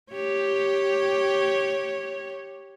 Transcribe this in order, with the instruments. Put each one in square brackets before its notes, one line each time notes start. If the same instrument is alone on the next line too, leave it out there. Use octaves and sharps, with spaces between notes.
[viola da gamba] G4 C#5